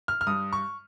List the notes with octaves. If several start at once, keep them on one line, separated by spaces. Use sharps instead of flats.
F6
F6
G2 D#6
C#6